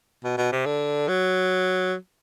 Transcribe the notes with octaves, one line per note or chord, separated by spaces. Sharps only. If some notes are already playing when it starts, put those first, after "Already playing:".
B2
B2
C3
D3
F#3